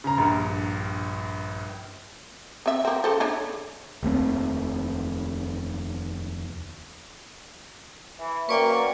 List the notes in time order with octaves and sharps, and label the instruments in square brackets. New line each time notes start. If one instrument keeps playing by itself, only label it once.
[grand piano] C#3 A#5
A#1 G2
[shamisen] C4 E5
A#3 C4
C#3 A4 C5
C#4 D4 E4
[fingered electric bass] F1 D#2 A3 C4
[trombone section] E3
[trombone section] F#2 [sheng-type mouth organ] A#3 C#6 [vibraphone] B4 D5 G5